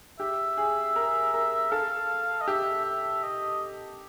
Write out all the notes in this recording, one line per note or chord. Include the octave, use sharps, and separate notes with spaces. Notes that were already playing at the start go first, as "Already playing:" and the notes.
G4 E5
G#4
A#4
A#4
A4 F5
D#5
G4 E5
E5
D#5